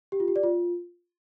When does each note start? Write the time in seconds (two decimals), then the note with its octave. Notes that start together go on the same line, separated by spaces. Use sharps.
0.12 G4
0.20 F4
0.28 G4
0.36 D5
0.43 F4